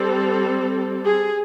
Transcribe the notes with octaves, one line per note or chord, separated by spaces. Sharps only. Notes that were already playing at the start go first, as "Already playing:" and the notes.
Already playing: G3 C4 A4
G#4